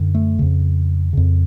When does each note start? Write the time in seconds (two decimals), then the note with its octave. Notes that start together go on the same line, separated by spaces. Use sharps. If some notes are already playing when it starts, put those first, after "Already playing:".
Already playing: F#2 D3
0.15 A3
0.39 F2 C#3
1.13 F2 C#3